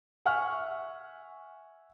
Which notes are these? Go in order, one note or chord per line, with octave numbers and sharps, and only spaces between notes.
E5 F#5 G#5 C#6 F6